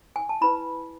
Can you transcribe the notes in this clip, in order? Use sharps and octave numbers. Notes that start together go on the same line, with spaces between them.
G#5
A5
E4 B4 B5